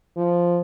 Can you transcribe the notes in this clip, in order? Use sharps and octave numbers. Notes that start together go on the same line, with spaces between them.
F3